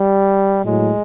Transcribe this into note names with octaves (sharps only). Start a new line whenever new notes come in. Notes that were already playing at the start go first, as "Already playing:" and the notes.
Already playing: G3
A2 F#3 G#3